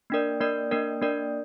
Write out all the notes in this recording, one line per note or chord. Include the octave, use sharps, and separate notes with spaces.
A#3 D4 A#4 D5
A#3 D4 A#4 D5
A#3 D4 A#4 D5
A#3 D4 A#4 D5